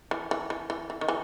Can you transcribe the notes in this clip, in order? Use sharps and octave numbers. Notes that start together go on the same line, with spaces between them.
E3
E3
E3
E3
E3
D#3
E3